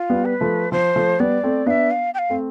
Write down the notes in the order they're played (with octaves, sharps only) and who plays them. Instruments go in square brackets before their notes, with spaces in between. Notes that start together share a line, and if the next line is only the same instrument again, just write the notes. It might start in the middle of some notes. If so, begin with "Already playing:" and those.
Already playing: [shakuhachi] F4
[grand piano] G3 B3
[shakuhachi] B4
[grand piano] F3 A3
[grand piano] F3 [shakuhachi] C5
[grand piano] F3 A3
[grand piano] G3 B3 [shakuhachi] D5
[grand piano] A3 C4
[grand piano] B3 D4 [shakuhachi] F5
[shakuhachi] E5
F5
G5
F5
[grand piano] A3 C4